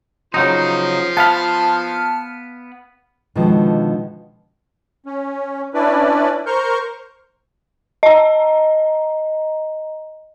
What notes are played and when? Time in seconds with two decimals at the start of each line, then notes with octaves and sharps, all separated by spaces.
0.34 C#3 F3 F#3 D#4 C6
1.17 B3 F5 A5 B5 F6
3.35 B2 D3 D#3 F3 G#3
5.06 C#4
5.74 C#4 D4 E4 B4 D5
6.46 A#4 C5 C#6 F6 G6
8.03 D#5 A#5